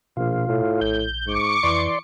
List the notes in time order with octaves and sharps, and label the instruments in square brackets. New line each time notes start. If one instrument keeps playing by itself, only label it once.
[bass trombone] A#1 [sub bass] B2 [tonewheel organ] F4
[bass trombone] A2
[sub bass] A#1 [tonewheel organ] G6
[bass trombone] G#2 [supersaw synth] C#6 D6 C#7
[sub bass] F2 [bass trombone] E3 [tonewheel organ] D5 C6